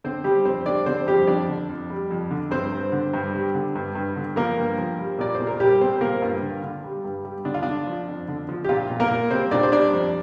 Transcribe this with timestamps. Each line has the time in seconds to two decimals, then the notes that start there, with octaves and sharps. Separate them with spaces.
0.04 D3 C4 C5
0.24 G3 G4
0.45 F2 C4 C5
0.65 G3 D4 D5
0.86 D3 C4 C5
1.07 F2 G3 G4
1.27 F2 D4 D5
1.48 D3
1.69 F2
1.90 G3
2.10 F2
2.31 D3
2.51 G2 C4 C5
2.72 G2
2.92 D3
3.14 G2
3.34 G3
3.55 D3
3.75 G2
3.95 G2
4.16 D3
4.36 F3 A#3 A#4
4.57 G2
4.78 F3
4.99 G3
5.19 A#2 D5
5.35 C5
5.40 A#2
5.47 A#4
5.60 A#2 G3 G4
5.81 G3 C4 C5
6.01 A#2 A#3 A#4
6.22 G2 F4
6.42 D3
6.63 D3
6.84 G3
7.04 G2
7.25 G3
7.45 D3 D4
7.54 F4
7.63 D3 D4
7.87 F3
8.07 F2
8.28 D3
8.49 F3
8.64 G4
8.69 A#2 F4
8.90 A#2
9.00 A#3 A#4
9.10 A#2
9.30 G3 C4 C5
9.51 A#2 D4 D5
9.63 C5
9.72 G3 D4 D5
9.93 F2